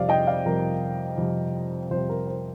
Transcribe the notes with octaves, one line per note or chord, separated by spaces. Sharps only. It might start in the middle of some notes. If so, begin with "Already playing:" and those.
Already playing: F2 C3 G3 D5 F5
D#5 G5
D5 F5
F2 C3 G3 A#4
F2 C3 G3
F2 C3 G3 C5
A#4
C5